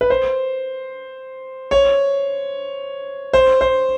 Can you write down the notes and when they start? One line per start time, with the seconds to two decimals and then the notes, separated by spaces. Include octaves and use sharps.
0.01 B4
0.10 C5
1.71 C#5
3.33 C5
3.61 C5